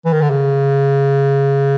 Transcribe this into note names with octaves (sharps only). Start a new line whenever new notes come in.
E3
D#3
D3
C#3